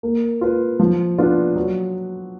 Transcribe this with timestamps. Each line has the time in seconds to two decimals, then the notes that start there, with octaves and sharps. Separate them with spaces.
0.03 A#3
0.41 F4 B4
0.79 F3
1.18 B3 D4 F4
1.56 F#3